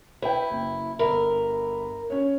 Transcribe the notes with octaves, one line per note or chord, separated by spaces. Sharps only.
E4 B4 G5
F#1
G1 A#4 E5 B5
C#4 C#5